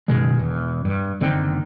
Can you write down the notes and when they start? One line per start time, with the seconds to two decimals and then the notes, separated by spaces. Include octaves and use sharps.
0.08 F#1 B2 D#3 G#3
0.38 E1 E2
0.85 G2
1.21 F#1 D3 D#3 C4